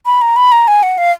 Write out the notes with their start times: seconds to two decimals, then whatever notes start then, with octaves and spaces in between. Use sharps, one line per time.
0.06 B5
0.21 A#5
0.36 B5
0.52 A#5
0.68 G#5
0.83 F#5
0.98 F5